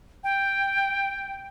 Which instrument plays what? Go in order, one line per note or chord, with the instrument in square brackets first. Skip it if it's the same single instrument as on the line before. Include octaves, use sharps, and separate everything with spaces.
[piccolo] G5